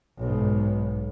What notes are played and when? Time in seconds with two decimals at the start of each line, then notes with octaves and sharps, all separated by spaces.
0.18 B1 G#2